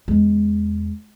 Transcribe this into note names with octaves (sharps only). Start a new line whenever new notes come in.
E2 G#3